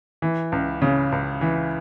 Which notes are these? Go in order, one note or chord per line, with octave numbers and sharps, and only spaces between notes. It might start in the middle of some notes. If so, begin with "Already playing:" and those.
E3
C#2
C#3
C#2
E3